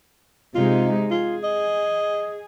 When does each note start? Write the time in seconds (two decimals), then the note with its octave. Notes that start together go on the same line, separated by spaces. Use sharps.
0.55 C3 G#3 D#4 F4
1.11 F4 G#4
1.44 D#5